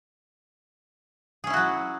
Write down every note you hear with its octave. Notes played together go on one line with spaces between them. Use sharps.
F#3 C#4 E4 F#4 G#4